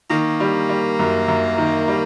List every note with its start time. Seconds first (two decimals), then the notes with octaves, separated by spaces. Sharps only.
0.10 D#3 A#3
0.40 G3
0.69 G3
0.99 F#2
1.28 F#2
1.58 D#3
1.88 G3